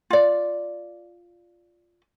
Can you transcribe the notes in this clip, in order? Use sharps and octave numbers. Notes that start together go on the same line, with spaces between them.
F4 D5